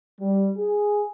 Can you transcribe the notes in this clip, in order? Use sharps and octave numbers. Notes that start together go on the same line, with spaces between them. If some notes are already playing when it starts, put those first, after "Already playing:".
G3
G#4